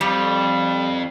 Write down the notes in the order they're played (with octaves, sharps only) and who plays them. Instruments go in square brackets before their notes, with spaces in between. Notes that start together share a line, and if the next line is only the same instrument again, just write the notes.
[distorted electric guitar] F2 [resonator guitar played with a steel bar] G3